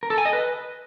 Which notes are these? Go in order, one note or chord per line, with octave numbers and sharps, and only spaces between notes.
A#4
A4
G#5
D#5
B4